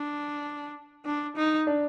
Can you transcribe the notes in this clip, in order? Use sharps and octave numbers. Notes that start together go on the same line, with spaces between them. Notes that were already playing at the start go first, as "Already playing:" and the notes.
Already playing: D4
D4
D#4
D4